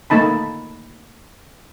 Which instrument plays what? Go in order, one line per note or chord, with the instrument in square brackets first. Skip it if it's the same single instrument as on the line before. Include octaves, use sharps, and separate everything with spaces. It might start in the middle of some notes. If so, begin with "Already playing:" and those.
[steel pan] A3 A#3 D#4 A5 B5